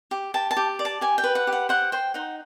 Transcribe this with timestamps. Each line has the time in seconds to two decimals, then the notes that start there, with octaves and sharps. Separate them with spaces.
0.11 G4
0.34 G4 A5
0.51 A5
0.57 G4
0.79 D5
0.85 A5
1.01 G4 G#5
1.18 G5
1.24 B4
1.35 F#5
1.47 G4
1.53 F#5
1.69 C5 F#5
1.92 C5 G5
2.14 D#4 F#5